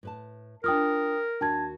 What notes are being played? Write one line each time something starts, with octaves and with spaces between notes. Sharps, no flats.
A2 B4 A5
D4 F4 A#4 G5 D#6 F6
D#2 D4 F#4 A5 G#6